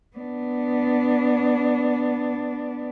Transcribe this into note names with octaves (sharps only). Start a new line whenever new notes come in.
B3 D4